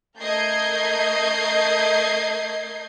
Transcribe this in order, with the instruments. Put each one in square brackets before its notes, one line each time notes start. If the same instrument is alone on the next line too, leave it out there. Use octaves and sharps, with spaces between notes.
[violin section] A3 A#4 D#5 G6 G#6 C7